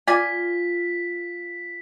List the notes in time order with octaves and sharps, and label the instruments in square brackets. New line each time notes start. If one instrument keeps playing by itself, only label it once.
[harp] F4 [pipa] D5 G#5 [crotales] B6